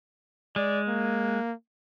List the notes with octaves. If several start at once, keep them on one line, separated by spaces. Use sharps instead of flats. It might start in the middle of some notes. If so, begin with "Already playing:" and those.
G#3 D5
A#3